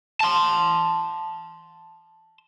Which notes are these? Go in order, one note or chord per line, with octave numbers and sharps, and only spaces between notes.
A5 C6